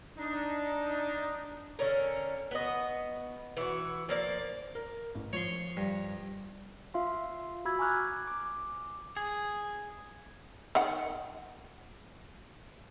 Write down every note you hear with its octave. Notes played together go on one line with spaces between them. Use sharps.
D4 D#4
D3 C#4 A#4
B3 F#4 D#5
E3 F#4
F3 A#3 D5
A#4
A1
F3 C#5 C6
G2
F4 E5 F5 C6
F#4 B5 E6 G#6
G#5 A#5 C#6 D6 F6 F#6
D6
G#4
D#3 F#5